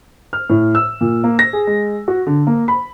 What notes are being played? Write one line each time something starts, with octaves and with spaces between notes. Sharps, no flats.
F6
A2
E6
A#2
A#3
A#6
G#4
G#3
F#4
D3
A#3
B5